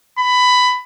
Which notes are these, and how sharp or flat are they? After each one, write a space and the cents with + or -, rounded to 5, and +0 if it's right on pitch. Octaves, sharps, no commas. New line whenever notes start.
B5 +15